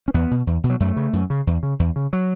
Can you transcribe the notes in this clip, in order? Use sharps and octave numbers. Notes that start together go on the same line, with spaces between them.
C#4
E2 B3
B2
E2
B2
F#3
F#2 A3
C#3
F#2
C#3
E2
C#3
E2
C#3
F#3